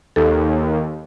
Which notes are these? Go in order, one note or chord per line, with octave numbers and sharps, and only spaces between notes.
D#2 A4